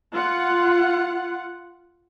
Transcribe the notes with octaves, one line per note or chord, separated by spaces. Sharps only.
F4 F#5